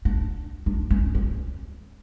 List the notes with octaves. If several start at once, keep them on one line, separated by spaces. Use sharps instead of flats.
D4
D4
C#4
C#4